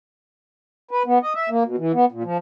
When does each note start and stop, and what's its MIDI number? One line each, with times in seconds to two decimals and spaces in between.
0.91 1.03 71
1.06 1.18 59
1.23 1.33 75
1.35 1.49 76
1.49 1.63 58
1.66 1.76 47
1.78 1.92 52
1.94 2.05 59
2.12 2.23 46
2.24 2.37 53